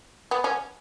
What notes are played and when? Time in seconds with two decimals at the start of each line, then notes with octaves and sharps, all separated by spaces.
0.31 B3
0.44 C#4